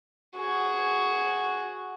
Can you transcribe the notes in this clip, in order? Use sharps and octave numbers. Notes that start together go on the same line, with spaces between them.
F#4 G#4